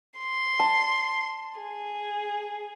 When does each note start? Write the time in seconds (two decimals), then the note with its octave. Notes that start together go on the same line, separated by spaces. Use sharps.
0.18 C6
0.60 A5
1.60 G#4